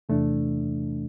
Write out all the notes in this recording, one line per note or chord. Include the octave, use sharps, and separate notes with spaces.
E2 C3 E3 A3 D4